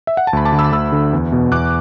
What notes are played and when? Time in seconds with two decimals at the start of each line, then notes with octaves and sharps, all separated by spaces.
0.07 E5
0.17 F#5
0.27 A5
0.33 D2 B5
0.45 A5 D6
0.52 D3
0.59 B5 E6
0.72 D2 B5 E6
0.92 D3
1.13 E2
1.32 B2
1.52 E2 D6 F#6